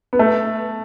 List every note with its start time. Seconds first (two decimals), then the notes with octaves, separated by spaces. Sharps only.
0.13 B3
0.19 A3